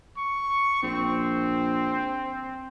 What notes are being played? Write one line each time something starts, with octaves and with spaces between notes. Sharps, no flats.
C#6
A#1 C4